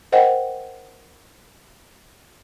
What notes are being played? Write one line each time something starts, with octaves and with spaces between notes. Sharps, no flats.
A#4 C5 D#5 F#5 G5